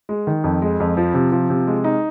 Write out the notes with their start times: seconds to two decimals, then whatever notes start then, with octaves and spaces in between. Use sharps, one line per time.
0.09 G#3
0.27 D#3
0.44 F2
0.62 G#3
0.80 F2
0.97 F3
1.14 C3
1.32 F3
1.50 C3
1.67 G#3
1.84 D#4